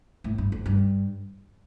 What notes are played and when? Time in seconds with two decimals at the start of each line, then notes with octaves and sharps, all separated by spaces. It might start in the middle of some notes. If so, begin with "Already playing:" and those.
0.24 A2
0.38 G2
0.52 F2
0.66 G2